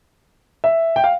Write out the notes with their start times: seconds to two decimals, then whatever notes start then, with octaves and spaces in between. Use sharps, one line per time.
0.64 E5
0.96 G5
1.04 F5